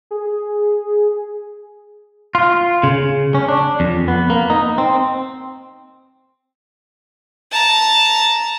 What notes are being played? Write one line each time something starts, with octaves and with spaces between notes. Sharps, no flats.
G#4
F4
C#3
C#4
D4
F2
B3
A#3
D#4
C4
A5 A#5